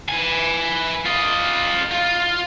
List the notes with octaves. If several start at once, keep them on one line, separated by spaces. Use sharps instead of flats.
B4 G#5
F4 D#5
F4